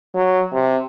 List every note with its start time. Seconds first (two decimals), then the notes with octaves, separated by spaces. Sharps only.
0.15 F#3
0.53 C3